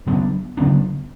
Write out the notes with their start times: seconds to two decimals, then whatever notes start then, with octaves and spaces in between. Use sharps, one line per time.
0.06 C#3 F#3 B3 D4
0.57 C#3 F#3 B3 D4